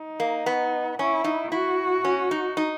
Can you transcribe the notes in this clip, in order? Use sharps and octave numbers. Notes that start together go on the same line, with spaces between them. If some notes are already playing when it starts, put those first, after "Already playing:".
Already playing: D#4
A#3
B3
C#4 E4
D#4
E4 F#4
C#4
D#4
D#4